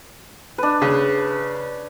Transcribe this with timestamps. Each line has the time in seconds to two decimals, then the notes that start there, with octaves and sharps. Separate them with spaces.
0.58 D4 B4
0.82 C#3